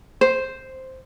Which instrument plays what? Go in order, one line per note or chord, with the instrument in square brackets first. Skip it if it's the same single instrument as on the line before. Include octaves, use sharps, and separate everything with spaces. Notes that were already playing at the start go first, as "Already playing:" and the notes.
[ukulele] C5